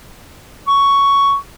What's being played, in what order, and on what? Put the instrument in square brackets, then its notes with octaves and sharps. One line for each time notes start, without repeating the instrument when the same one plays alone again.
[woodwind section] C#6